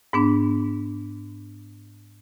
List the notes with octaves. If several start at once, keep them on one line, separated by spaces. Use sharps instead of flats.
G#2 B3 D4